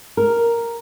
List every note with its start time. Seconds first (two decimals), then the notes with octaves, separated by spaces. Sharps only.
0.17 A#4